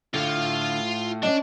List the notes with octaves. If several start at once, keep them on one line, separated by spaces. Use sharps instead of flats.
A2 D3 F4 F5
C#4 D4 D5 D#5